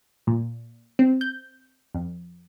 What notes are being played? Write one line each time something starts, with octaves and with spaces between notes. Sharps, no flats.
A#2
C4
G6
F2